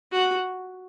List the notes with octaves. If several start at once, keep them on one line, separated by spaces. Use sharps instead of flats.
F#4